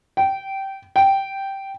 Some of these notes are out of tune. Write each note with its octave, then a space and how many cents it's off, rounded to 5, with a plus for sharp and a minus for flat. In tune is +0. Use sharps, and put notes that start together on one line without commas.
G5 -15
G5 -5